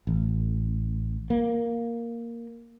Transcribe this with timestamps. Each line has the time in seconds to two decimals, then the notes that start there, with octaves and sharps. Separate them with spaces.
0.07 A1
1.30 A#3